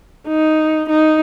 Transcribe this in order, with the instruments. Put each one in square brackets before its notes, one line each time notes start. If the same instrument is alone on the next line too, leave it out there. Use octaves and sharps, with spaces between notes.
[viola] D#4
D#4